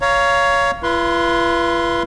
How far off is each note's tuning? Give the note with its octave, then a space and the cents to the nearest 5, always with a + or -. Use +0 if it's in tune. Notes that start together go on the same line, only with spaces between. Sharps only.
C#5 +15 F5 -10 A#5 +10
F4 -45 B4 -20 C6 +0